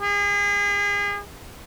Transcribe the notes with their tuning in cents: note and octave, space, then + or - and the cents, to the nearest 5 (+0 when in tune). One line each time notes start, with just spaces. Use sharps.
G#4 -35